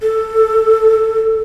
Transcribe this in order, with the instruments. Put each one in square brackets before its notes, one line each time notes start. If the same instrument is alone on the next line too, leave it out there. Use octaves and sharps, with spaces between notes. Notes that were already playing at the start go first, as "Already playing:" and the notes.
[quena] A4